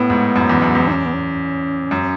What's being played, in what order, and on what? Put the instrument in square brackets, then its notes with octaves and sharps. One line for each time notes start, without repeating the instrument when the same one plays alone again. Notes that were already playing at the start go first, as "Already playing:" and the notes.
Already playing: [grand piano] A2 [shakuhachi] B3
[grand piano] G#2
F#2
E2
F#2
E2
[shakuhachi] D#4
C#4
B3
C#4
[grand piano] F#2